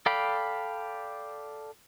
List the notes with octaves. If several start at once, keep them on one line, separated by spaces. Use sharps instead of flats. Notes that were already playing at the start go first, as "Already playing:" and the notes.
A4 D5 F5 G5 B5